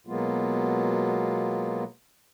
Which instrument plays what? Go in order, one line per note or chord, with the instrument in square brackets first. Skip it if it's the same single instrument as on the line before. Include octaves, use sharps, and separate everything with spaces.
[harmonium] B2 F#3 G#3 A#3 B3 F4